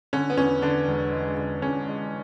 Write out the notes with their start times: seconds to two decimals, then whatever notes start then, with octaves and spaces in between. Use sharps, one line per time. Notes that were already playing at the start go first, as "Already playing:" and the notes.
0.13 D3 C#4
0.30 B3
0.37 E2 C#4
0.62 D3 D4
0.87 E1
1.12 G#3
1.37 D3
1.62 E1 C#4
1.87 G#3